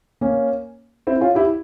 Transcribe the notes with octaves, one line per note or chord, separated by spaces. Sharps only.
A#3 C#4
C4 E4
C#4 F4
E4 G4